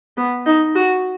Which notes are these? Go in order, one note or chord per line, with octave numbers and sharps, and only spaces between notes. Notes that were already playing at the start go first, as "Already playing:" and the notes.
B3
D#4
F#4